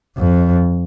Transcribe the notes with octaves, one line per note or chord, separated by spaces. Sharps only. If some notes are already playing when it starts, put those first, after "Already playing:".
F2